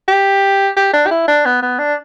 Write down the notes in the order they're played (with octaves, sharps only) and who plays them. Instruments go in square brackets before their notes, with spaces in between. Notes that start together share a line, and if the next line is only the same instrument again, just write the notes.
[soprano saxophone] G4
G4
D4
G4
E4
D4
B3
B3
D4